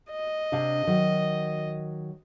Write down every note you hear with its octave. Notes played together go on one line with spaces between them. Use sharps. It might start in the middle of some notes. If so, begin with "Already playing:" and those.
D#5
C3 D4 F5
D#3 F#3